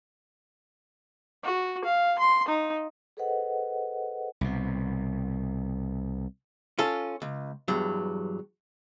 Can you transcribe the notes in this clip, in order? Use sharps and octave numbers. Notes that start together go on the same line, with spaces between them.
F#4
F5
C6
D#4
G#4 A4 B4 C5 D#5 F#5
C2 B2
C#4 F4 A4
C#2
E2 G2 F#3